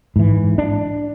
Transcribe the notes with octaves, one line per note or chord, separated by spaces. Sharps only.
G#2 E3
D4